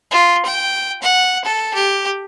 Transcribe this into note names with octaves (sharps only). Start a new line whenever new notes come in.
F4
G5
F#5
A4
G4